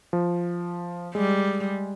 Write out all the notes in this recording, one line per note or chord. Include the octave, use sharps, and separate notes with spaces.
F3
G3 G#3